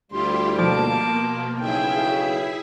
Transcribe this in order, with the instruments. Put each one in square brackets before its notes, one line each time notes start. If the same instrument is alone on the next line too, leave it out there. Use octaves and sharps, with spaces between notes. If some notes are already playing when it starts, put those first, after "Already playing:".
[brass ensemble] D2 G3 [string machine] E4 F4 G4 [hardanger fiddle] C6
[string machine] B2 A#3 [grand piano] F3 [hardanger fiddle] A5 D6
[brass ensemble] B1 C#3 [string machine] E4 G#4 E5 [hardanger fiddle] G5